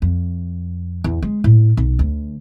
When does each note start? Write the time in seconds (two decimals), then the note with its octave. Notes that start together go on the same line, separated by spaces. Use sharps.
0.02 F2
1.04 E2
1.22 G#3
1.44 A2
1.77 B1
1.99 D2